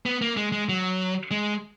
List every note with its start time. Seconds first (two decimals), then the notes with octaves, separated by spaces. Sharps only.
0.06 B3
0.22 A#3
0.37 G#3
0.52 G#3
0.69 F#3
1.31 G#3